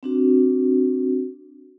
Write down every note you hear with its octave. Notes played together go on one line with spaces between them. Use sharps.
C4 D4 F#4